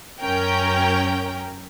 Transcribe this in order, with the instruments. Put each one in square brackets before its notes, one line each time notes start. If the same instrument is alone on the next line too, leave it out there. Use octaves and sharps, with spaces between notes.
[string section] F#2 C#4 A#4 G5